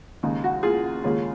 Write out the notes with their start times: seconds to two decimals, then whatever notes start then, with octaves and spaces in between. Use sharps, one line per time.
0.23 D#2 C#3 G#3 D#4
0.44 F#4
0.63 F4 G#4
1.04 D#2 C#3 G#3 C#4 F4